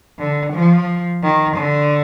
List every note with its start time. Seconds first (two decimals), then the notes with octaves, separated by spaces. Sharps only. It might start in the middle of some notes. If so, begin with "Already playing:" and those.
0.19 D3
0.53 F3
1.23 D#3
1.57 D3